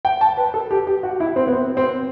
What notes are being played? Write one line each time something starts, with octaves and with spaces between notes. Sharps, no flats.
G5
A5
B4
A4
G4
G4
F#4
E4
C4
B3
C4
C4